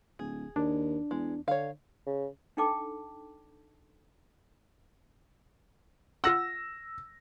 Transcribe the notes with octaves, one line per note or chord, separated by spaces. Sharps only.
D1 G#4
D#2 D4
E2 G#3
D3 C#5 F5
C#3
D4 D#4 A4 G5 A5 D6
F4 F#5 E6 A#6